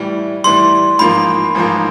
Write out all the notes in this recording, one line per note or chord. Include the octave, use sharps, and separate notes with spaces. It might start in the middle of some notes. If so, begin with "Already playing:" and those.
Already playing: A2 E3 G3
A2 E3 G3 C6
A1 G#2 F3 A#3 B5
A1 G#2 F3 A#3